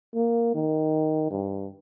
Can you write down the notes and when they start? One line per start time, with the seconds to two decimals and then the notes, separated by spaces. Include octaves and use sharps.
0.15 A#3
0.55 D#3
1.30 G2